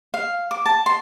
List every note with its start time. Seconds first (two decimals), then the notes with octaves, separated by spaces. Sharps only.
0.14 F5
0.51 D6
0.66 A5
0.86 C6